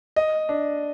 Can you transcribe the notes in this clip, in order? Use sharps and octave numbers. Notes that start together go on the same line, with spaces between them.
D#5
D4